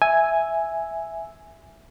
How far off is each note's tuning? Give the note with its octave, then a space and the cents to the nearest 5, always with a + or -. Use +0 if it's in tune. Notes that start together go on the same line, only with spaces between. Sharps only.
E5 +0 G#5 +0